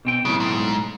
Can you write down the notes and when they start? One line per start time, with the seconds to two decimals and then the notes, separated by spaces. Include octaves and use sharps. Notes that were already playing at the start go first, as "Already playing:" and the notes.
0.05 B2 C4 G5
0.25 B1 A2 C#3 G#3
0.40 G#2